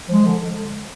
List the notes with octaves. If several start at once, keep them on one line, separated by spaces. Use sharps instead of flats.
F3 G#3
D3